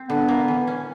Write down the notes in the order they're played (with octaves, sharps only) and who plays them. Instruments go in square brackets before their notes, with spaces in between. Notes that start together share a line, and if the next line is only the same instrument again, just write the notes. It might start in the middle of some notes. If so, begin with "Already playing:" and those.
Already playing: [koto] C4
[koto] D3 [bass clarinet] B3
[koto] A#3
E3
C#4